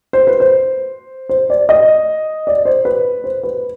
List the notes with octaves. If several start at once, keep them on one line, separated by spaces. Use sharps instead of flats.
C5
B4
C5
C5
D5
D#5
D5
C5
B4
C5
B4